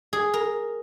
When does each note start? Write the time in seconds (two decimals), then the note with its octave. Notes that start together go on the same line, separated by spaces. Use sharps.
0.13 G#4
0.34 A#4